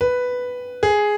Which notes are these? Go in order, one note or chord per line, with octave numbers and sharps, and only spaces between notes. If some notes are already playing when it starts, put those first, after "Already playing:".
B4
G#4